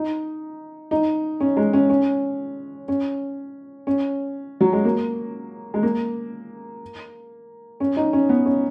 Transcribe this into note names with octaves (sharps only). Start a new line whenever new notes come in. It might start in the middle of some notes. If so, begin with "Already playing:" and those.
Already playing: D#4
D#4
C#4
G#3
C#4
C#4
C#4
C#4
F#3
G#3
A#3
G#3
A#3
C#4
D#4
C#4
B3
C#4